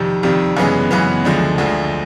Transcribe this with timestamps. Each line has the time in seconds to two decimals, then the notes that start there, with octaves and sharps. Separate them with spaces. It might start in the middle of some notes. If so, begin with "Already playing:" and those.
Already playing: F2 C3 D#3 G3
0.23 F2 C3 D#3 G3
0.57 F#2 C#3 E3 G#3 B3
0.91 F#2 C#3 E3 G#3 B3
1.24 D2 D3 F3 G#3
1.58 D2 D3 F3 G#3